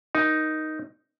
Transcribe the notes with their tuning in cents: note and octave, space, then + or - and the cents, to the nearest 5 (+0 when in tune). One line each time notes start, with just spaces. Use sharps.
D#4 +0 A#4 +30